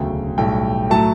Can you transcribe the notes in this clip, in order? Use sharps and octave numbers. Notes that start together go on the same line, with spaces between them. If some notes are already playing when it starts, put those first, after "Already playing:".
Already playing: E1 D2 C#3 F#3 A3 G5
B1 A2 G3 G5
A2 F#3 A3 A5